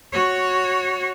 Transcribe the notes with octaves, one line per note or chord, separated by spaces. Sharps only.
F#4 C#5